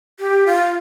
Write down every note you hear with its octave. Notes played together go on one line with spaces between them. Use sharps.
G4
F4